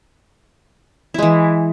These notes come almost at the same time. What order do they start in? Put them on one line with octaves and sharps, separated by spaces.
E4 G#3 E3